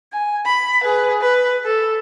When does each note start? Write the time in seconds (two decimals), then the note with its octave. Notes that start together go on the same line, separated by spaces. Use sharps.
0.13 G#5
0.46 B5
0.84 G#4 B4
1.21 B4
1.65 A4